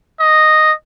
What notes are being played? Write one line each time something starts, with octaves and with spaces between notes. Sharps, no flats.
D#5